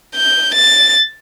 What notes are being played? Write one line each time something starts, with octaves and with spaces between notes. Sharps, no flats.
G6
A6